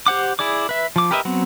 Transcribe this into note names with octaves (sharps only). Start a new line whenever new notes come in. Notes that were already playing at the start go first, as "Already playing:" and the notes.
G4 C5 F#5 D6
E4 G#4 D5 D6
B4 E5
F3 D6
G4 A#4 B4 D#5 E5
F#3 B3 C4